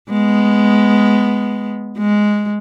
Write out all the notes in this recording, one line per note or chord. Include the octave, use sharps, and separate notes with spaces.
G#3 B3
G#3